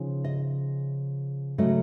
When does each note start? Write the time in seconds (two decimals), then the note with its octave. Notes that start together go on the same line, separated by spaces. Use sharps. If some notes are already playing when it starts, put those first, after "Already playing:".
Already playing: C#3 F3 D#4
0.24 D#5
1.58 C#3 F#3 A3 C#4 D#5